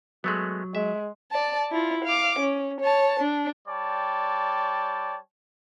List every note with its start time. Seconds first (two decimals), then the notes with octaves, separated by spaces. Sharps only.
0.24 F#3 G#3 A3 B3
0.75 G#3 E5
1.32 D5 A5
1.72 E4 F4
2.05 F5 D6
2.39 C#4
2.81 C#5 A5
3.20 D4
3.68 G3 C#5 D5 G5 A5